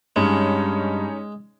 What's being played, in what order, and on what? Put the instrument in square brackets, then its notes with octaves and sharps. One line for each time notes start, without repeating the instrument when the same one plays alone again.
[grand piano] G2 [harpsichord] G#3 [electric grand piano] C#4 D#4 C#5